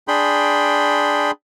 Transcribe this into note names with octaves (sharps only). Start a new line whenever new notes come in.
D4 G#4 G5 B5 C6